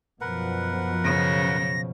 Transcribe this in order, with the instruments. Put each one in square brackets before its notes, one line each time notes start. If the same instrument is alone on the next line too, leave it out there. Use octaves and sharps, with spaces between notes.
[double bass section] F#2 B2 F3 [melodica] A#4 B4 F#5
[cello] C#3 [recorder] A#6